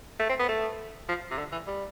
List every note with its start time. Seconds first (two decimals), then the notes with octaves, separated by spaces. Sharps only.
0.19 A3
0.29 C4
0.39 B3
0.49 A3
1.09 F3
1.31 C3
1.38 D3
1.52 E3
1.67 G3